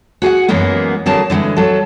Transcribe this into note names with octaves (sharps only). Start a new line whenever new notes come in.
F#4 G#4 F5 F#5
F#2 E3 G#3 A#3 B3
D3 F#3 A#3 G#4 A5
D3 E3 F#3 G#3
F#3 A4